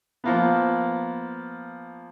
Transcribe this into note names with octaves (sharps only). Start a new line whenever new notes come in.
F3 A#3 B3